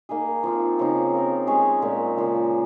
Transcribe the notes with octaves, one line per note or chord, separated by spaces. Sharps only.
A#3 D#4 G#4
F3 C4 F4
C#3 F3 C4 D#4
C4 F4 A#4
G#3 C#4 G#4 C#5
A#2 G#3 C4
C#3 F3 A#3